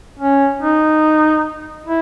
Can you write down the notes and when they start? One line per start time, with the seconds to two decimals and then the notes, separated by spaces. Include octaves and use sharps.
0.19 C#4
0.61 D#4
1.86 E4